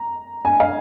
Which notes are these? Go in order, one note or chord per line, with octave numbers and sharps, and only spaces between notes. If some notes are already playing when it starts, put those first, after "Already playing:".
Already playing: A#5
G#5
F5